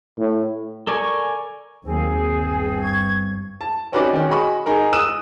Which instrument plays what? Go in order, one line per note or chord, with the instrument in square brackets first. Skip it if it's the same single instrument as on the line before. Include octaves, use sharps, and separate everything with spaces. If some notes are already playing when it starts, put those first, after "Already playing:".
[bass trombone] A2
[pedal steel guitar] A4 A#4 D5 G#5 C#6
[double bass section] D#2 F#3 A#3 [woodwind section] C4 [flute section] G#4
[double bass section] G1 G2
[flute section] C#6 G#6
[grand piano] A5
C4 C#4 D#4 F#4 B4 D5
D#3 C#4
F#4 G#4 D#5 B5 C#6
D#4 G#4 A#4
D#6 E6 F#6 D#7 E7